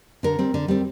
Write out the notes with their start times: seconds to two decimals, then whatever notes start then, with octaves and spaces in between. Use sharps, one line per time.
0.23 D3 A#4
0.39 G3 C4
0.54 D3
0.68 G3 C4